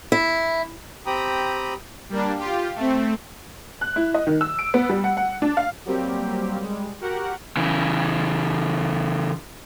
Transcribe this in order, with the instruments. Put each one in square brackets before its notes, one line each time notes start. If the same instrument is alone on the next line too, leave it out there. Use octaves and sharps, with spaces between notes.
[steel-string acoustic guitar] E4
[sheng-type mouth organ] C4 G4 G5 A#5 B5 D#6
[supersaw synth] G3 A#3 D4
F4 G4
A3 C4
[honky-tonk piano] F#6
E4
D#5
D#3
E6
D7
B3
G3
F#5
F#5
D4
F5
[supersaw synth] F#3 G3 A#3 C4 G4
G3 G#3
F#4 G4 A#4 F#5
[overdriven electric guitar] C#3 E3